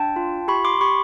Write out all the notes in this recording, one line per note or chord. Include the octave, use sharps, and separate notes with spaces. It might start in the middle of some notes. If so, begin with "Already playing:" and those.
Already playing: D4 G5 A5
F4
G4 B5 C#6
C6 D6
G4 B5 C#6